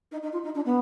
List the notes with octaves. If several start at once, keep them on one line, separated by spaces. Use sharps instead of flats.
D#4
D#4
F4
D#4
D4
B3